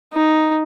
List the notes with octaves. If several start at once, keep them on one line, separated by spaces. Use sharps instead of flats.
D#4